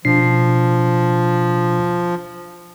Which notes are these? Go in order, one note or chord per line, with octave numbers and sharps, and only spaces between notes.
B2 F3 D4 C7